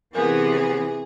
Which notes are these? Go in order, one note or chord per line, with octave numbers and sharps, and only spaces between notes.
C3 E3 B3 G#4 A#4